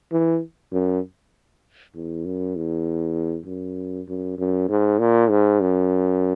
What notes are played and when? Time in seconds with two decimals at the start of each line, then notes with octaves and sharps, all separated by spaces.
0.12 E3
0.72 F#2
1.95 E2
2.25 F#2
2.56 E2
3.46 F#2
4.08 F#2
4.38 F#2
4.68 G#2
4.99 A#2
5.30 G#2
5.61 F#2